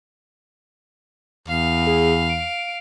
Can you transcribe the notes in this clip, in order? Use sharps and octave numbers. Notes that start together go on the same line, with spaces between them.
E2 F5
G#4
D7